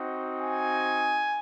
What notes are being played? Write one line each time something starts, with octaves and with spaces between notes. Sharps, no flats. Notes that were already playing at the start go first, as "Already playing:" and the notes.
Already playing: C4 D#4 F#4
G#5